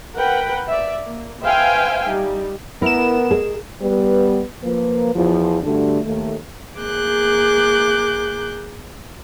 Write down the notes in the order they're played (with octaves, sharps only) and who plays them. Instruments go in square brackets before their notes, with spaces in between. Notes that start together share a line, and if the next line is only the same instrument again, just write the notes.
[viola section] A#4 B4 F#5 G5 B5
D5 E5
A#3
B4 C5 E5 F5 G5 G#5
G3 D#4
[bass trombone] B3 [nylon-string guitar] E4 [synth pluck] A#4 E7
[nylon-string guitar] G#4 D#5
[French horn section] G3 B3 B4
F3 A#3 B4
E2 F3
G2 D3 A3 D4 F#4 G4
D#2 A3
[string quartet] A#3 G#4 D6 F#6 G6